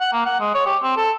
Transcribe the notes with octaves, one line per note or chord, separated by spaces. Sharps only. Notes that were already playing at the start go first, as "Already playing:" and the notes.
F#5
A#3
F#5
G#3
C#5
G4
C4
A4